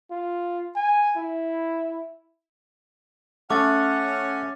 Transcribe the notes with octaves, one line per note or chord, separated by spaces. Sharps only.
F4
G#5
E4
A3 C#4 F#5 D6 A6